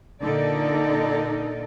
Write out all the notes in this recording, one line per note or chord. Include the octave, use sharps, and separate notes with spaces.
A#2 D3 D#4 A4 A#4 D5